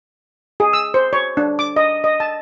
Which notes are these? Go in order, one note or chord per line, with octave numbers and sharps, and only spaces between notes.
G#4
E6
C5
C#5
D4
D6
D#5
D#5
A5